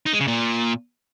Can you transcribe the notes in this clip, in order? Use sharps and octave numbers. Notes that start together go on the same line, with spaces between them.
D#4
G#3
C#3
A#2